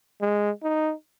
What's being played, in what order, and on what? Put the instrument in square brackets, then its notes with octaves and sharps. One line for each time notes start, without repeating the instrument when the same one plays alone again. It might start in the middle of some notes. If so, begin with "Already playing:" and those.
[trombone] G#3
D#4